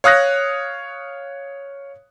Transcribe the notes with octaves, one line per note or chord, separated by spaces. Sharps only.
C#5 F5 D#6 F#6 A#6